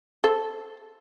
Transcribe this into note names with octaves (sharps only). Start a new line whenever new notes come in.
A4 C5